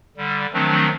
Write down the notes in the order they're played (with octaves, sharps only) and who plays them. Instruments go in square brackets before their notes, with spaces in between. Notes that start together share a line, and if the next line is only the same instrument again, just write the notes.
[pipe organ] D3 G3
D#3 F3 F#3 A3 C4 D4